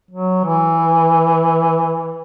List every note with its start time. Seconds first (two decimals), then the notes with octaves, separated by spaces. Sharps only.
0.11 F#3
0.45 E3